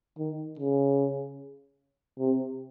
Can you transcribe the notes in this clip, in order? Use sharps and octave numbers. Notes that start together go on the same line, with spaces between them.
D#3
C#3
C3